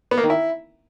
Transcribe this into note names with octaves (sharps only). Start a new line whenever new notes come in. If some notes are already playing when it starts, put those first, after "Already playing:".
B3
A#3
D#3
E4